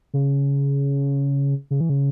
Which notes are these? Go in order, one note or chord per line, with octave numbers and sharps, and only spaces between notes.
C#3
C#3
E3
C#3